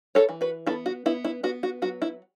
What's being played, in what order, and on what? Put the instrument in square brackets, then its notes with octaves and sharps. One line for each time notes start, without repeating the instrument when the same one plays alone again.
[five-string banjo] A4 C#5
E3
F#4 B4
B3 E4 A4
F#4
B3 E4
E4
B3 F#4
F#4
F#3 F#4
E4